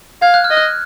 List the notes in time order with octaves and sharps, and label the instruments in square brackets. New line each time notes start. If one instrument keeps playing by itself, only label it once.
[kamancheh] F5 [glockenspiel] G#6
[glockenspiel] F#6
F6
[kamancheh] D#5
[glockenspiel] F#6